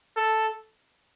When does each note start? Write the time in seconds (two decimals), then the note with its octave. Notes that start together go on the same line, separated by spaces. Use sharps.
0.17 A4